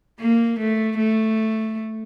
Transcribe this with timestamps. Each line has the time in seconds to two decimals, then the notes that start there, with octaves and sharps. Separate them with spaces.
0.20 A#3
0.59 A3
0.98 A3